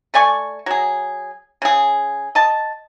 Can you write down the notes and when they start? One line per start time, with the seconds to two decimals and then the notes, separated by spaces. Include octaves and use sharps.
0.14 A3 D5 G#5 C#6
0.66 F#3 G#4
1.62 C#3 G#4
2.35 D#5 A5